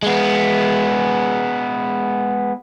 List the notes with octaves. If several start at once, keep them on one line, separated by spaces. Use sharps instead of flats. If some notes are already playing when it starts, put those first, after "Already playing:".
G#3 B3